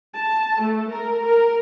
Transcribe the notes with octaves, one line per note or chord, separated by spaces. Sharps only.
A5
A3
A#4
A#4